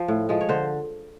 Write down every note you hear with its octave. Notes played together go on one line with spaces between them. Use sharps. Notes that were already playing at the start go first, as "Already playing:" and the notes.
Already playing: F3 C5
A2
F3 G#3
C#5
D3 C5